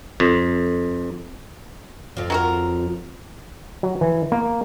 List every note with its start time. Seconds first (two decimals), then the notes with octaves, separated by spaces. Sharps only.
0.20 F2
2.17 F2 F3
2.30 F#3 F#4 A#4
3.83 F#3
4.01 E3
4.32 A#3